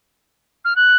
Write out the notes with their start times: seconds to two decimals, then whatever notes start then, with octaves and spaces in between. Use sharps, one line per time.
0.65 F6
0.76 F#6